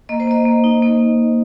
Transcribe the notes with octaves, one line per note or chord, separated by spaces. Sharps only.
A#3 D#5
C5
A#3 D#5
A#3
D#4
A#3